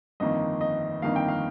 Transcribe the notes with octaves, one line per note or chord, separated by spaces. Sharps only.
G1 F2 D#3 A#3 D#4 D#5
D#5
G1 F2 D#3 A#3 D#4 F5
G5
F5